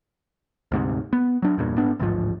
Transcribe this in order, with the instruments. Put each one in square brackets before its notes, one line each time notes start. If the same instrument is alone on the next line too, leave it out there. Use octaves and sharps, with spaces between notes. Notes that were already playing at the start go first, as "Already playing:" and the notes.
[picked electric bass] D2 G#2 C3
B3
F#3 D4
E2 G2 A#2
G#2 B3 D4
A1 D2 G#2 F3